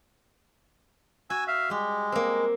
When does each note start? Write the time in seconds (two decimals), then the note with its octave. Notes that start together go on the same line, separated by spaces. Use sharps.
1.30 F#4 G#5 E6
1.48 E5 F5
1.70 G3 G#3 G4
2.12 A#3 C4